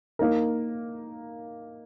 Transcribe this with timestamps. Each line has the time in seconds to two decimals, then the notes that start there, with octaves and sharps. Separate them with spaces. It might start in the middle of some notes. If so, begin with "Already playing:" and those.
0.19 A#3 D#4 A#4